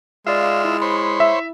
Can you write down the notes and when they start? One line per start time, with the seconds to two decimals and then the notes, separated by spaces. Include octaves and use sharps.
0.27 G#3 F4 D5 E5 F5
0.65 E4
0.82 C5 C#5 B5
1.20 E5